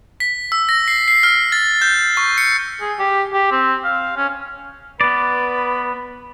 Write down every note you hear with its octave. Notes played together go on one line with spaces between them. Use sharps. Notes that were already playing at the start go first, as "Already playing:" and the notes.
B6
E6
A#6
C7
C7
F6
A6
G6
C#6
C#7
G#4
G4
G4
C4
F5
C#4
B3 B4 D5